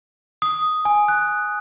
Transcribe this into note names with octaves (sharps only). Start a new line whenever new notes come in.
D#6
G#5
F#6